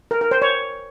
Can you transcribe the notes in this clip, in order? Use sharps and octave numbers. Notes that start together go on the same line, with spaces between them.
A#4
A#4
C5
C#5